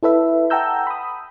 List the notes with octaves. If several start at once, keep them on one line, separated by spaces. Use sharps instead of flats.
E4 A4 B4 E5
F#5 G5 A5 A#5 E6 G6
B5 D#6